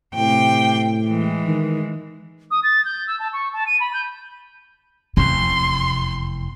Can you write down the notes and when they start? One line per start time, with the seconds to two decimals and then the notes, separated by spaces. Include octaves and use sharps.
0.15 A2 C3 G5
1.07 E3 G#3
1.45 D#3
2.51 D#6
2.63 A6
2.85 G6
3.07 E6
3.19 A5
3.33 C#6
3.53 A5
3.67 D#7
3.80 B5
3.93 G6
5.17 F1 E2 C3 C6